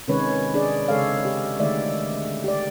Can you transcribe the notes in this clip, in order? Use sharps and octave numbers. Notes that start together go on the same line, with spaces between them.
C3 D#3 G#3 C#4 B4 C#5
D4 G#4 D5
C#3 G#3 A4 C#5 F5
G4
D3 D#3 G#3 A3 D5 E5
G4 D5